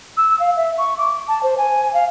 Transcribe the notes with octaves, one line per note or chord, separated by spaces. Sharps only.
E6
F5
E5
C#6
D6
A5
C5
G#5
F5